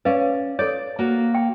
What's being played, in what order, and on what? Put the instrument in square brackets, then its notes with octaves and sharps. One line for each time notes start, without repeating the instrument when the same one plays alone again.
[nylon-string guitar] C#4 D5 [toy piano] B4 F5
[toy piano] A4 C#5 [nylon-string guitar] D5
[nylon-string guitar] A#3 F#4
[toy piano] G5